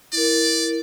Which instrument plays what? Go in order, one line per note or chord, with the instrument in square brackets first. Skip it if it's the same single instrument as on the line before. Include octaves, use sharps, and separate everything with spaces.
[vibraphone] E4 A#4 [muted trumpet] D5